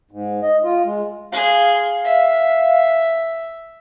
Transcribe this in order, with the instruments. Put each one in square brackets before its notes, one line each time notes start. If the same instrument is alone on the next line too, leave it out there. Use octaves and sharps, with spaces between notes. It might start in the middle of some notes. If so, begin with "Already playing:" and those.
[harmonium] G#2
D#5
F4
G#3
[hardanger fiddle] G#4 C6 [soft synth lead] F5
[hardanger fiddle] E5